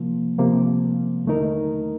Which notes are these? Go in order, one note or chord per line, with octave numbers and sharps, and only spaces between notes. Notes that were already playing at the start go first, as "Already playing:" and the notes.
Already playing: C3 F3 A#3
C3 F3 A#3
D#2 D3 A3 D#4 A#4